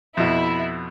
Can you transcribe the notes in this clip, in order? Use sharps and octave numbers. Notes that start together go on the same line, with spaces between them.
F2 B2 E4